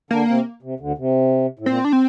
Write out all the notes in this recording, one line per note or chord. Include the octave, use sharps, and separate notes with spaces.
D3 A#3 D4
C3 C4
C3
D2 D3
C3
A2
A#2 C4
D4
C4